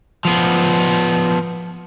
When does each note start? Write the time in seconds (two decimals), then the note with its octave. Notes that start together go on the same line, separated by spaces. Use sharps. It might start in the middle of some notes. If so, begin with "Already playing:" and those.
0.25 F3 B3